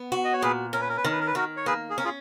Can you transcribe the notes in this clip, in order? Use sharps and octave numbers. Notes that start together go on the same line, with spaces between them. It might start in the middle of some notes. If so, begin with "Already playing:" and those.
Already playing: B3
F#4
D#5
C#5
A#2 G#4 B4
C#4 A#4
B4
A#4
B4
D#3 A#4
B4
A#4
B4
D#3 F#4 A#4
C#5
A#3 G#4 B4
G#4
C#4 A#4
F4 G#4